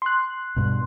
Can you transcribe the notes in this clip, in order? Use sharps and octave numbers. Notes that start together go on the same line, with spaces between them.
C6 F#6
G2 B2